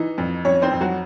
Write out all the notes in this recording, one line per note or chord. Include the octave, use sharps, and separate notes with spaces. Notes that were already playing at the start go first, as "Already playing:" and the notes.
Already playing: E3 D#4 D#5
F2
F2 C#4 C#5
C4 C5
F2
F#3 F#4